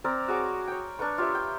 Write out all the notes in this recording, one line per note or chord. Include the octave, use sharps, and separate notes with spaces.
C4 A#4 D5
F#4 G#4 C#5 D6
C#5 G5
D4 A#4 B4 C#6
F4 G4 C#5 E5
G5